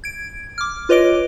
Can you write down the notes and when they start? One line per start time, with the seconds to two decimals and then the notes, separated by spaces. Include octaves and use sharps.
0.04 G#6 D7
0.58 D6 F6
0.89 F4 B4 C#5 D#5 D6 D7